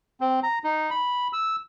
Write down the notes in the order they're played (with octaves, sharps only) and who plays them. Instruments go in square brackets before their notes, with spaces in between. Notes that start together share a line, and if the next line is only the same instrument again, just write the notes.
[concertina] C4
A#5
D#4
B5
E6